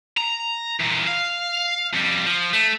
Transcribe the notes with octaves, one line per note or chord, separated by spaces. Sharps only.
A#5
E2 A#2
F5
F2 G3
F3
A3